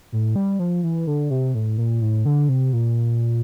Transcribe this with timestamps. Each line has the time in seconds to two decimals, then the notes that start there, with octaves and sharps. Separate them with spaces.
0.12 A2
0.36 G3
0.59 F3
0.83 E3
1.07 D3
1.30 C3
1.55 A2
1.78 A#2
2.01 A2
2.25 D3
2.49 C3
2.73 A#2